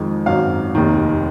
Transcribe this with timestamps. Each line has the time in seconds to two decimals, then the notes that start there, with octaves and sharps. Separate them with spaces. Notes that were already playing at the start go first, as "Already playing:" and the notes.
Already playing: F2 D#3 G#3
0.26 G#1 F#2 D#3 F#3 F5
0.75 F1 D#2 D#3